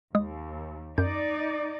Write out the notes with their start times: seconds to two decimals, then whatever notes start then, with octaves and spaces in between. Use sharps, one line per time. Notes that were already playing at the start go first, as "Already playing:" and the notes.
0.15 D#2 G#3 D#6
0.98 F#2 D#4 D5 G6